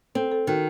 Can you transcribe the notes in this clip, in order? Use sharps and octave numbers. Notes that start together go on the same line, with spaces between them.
C4 A4
A4
D#3 F#4